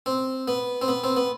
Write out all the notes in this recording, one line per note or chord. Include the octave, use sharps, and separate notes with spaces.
C4
B3
C4
B3
C4
B3